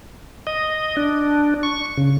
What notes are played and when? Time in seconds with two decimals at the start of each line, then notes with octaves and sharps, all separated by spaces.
0.47 D#5
0.97 D4
1.63 C#6
1.97 C#3